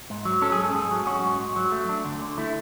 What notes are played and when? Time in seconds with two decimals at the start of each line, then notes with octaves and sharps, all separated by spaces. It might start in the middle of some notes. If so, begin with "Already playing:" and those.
0.10 G#2
0.25 F#3
0.42 C#4 A4
0.52 G#4
0.58 G#2
0.64 A4
0.74 G#2 G#4
0.91 F#3
1.06 C#4 F#4
1.23 G#2
1.39 G#2
1.56 F#3
1.72 A3
1.89 D4
2.05 D2
2.21 D3
2.38 A3 E4